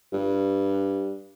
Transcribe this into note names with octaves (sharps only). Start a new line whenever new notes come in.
G2